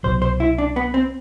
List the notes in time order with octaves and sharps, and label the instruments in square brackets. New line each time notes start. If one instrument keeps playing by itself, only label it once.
[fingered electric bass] C2 B2 F#3 [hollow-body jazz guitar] C5
[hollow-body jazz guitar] C5
E4
D4
B3
C4